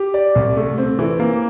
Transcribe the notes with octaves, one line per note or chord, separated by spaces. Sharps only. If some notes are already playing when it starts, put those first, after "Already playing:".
Already playing: G4
D5
C2
A3
C4
E3
A#3